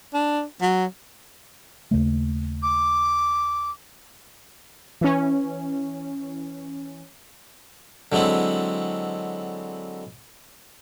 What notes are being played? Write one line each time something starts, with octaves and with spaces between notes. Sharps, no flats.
D4
F#3
D#2 C#3 A3
D6
E3 C#4
D3 F#3 G#3 C4 E4